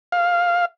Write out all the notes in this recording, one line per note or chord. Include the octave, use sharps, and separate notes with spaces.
F5